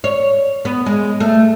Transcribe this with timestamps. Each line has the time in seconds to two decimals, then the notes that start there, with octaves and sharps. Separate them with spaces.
0.04 C#5
0.65 B3
0.86 G#3
1.20 A3